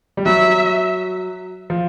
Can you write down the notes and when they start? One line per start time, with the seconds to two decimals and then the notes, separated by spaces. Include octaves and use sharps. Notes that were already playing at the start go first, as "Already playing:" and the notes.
0.17 G3
0.26 F#3 E5
1.70 F3